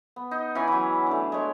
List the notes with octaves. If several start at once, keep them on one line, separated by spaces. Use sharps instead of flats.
B3
D#4
E3 C#4 G#5 B5
E3 F#3
A3 D4
G#3 C#5